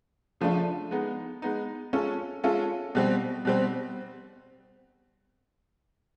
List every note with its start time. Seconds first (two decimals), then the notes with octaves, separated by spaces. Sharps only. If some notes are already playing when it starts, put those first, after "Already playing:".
0.41 C#3 F3 A3 D4 F4
0.91 G#3 B3 D#4
1.42 G#3 B3 D#4
1.93 G#3 C#4 F4 A4
2.44 G#3 C#4 F4 A4
2.95 B2 G3 C4
3.45 B2 G3 C4